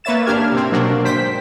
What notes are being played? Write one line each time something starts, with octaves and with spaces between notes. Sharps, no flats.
A#3 B4 C#5 E5 A6 E7
G#1 A#3 D4 G4 F6 G#6
C3 C4
B2 F#3 A#3 D4
G#1 C5 G5 B6